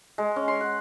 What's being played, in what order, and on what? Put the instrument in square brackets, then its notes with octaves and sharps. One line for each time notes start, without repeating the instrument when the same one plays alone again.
[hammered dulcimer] G#3
C#4
C6
F#5